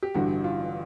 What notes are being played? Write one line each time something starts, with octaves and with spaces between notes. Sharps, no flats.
G4
A1 G2 D3 F#4
F4